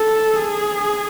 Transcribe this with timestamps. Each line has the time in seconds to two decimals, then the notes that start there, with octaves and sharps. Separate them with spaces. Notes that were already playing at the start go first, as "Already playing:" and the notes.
Already playing: A4
0.38 G#4